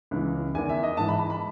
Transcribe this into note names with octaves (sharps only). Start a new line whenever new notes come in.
C#2 C#3 E3
E2 D#3 G#5
E5
D#5
G#2 E3 A5
B5
B5
B5